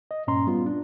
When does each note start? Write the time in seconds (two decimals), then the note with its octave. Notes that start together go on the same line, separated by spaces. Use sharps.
0.11 D#5
0.27 G2 A#2 C#4 A#5 C6
0.47 G3 B3 F4
0.66 D4